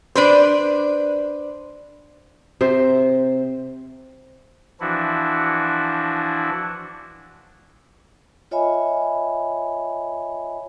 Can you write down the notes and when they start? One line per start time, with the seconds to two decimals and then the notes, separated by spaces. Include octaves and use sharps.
0.15 D4 B4 C5
2.61 C3 C5 E5
4.80 E3 F3 D4 E4 F#4
8.51 F4 C#5 D#5 E5 G#5 B5